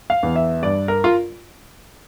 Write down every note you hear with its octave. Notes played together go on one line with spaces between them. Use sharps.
F5
E2
E5
G2 D5
A#4
F4